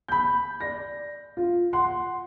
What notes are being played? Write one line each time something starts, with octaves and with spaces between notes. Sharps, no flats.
B5 G6
D5 A#6
F4
F#5 C6